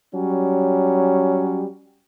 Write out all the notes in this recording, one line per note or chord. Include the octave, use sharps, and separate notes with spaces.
F#3 G3 C#4